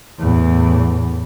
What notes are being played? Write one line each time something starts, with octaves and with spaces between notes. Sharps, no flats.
E2 A2